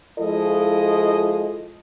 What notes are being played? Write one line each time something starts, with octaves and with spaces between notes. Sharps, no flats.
F3 G#3 E4 F4 A4 D#5